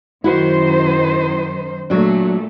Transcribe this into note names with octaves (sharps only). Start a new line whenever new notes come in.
F#2 D#3 E4 F#4 C5
A#2 F#3 A3 D4